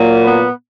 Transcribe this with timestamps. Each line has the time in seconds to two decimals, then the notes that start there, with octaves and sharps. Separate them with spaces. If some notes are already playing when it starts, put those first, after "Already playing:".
Already playing: A#2 F#3 A#3
0.24 B3 B4